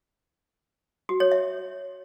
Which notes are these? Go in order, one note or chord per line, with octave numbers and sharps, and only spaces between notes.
F#4
C#5
E5